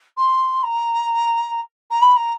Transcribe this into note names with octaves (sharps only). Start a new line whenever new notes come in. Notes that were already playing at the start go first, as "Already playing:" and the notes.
C6
A#5
A#5
B5
A#5